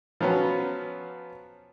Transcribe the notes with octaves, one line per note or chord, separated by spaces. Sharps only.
F3 F#3 B3 C#4